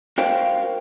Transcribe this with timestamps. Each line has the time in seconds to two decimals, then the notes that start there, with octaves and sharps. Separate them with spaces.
0.18 F#4 A#4 C5 F5 G5